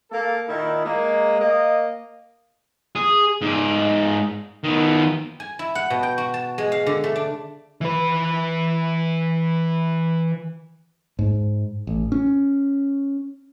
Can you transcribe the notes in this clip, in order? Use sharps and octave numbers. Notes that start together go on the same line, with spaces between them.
A#3 A4
A#2 D#3 D#4 E4
G#3 A#3
A#3 D#5
G#4
G#2 D5
D#3 B3
G#5
E4
F#5
B2
G5
F#4
A5
G#3
F5
D3
A3
D4
E3 B4
G#2
A1
C#4